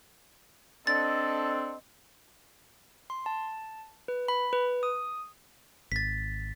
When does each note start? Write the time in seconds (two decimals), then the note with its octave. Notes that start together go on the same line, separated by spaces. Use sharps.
0.87 C4 D4 A4 D#5 A6
3.10 C6
3.26 A5
4.08 B4
4.28 B5
4.53 B4
4.83 D#6
5.92 G#1 A6 B6